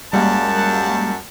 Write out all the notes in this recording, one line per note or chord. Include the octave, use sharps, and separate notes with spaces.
F#2 G3 G#3 A#3 F#5 A5